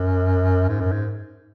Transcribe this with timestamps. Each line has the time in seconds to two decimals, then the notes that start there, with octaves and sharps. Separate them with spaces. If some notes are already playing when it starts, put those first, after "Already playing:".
Already playing: F#2
0.69 G#2
0.81 F#2
0.92 G#2